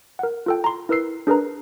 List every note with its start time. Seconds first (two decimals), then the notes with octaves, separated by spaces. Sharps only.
0.19 A#4 F#5
0.46 F4 A4 G5
0.64 A#5 C6
0.89 E4 A#4 B4 E6 C7
1.27 D4 G#4 A#4 B4 A#5